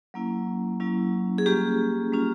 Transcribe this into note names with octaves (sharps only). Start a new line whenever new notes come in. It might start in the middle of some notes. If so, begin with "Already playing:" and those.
F#3 A#3 C#4 E4
F#3 A#3 C#4 E4
G#4
G3 A#3 C#4 F4 G4
G3 A#3 C#4 F4